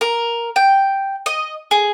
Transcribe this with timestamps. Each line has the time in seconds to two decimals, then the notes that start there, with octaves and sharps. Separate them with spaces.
0.01 A#4
0.56 G5
1.26 D#5
1.71 G#4